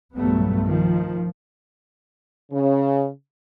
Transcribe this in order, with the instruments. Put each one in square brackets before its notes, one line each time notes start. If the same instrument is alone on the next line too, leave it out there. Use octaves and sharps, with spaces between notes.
[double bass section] B1 G2 A#2 F#3 A3 B3
D#3 F3
[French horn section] C#3